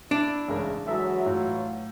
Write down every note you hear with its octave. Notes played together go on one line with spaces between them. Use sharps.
D4 E4
A1 C#3 G#3 A#4
E3 F#3 G#3 A4 E5 A#5
A2 F4